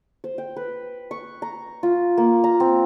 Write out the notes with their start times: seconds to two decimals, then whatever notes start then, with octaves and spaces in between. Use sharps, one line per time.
0.24 C5
0.38 G5
0.56 B4
1.11 C#6
1.42 A#5
1.83 F4
2.17 A#3
2.44 A#5
2.60 C4